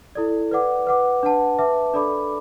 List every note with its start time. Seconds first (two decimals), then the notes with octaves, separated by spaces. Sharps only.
0.15 E4 A4 D5
0.51 B4 D5 F#5 D6
0.87 B4 F#5 D6
1.23 D4 B4 F#5 A5
1.59 B4 E5 A5 D6
1.94 D4 A4 D5 B5 D6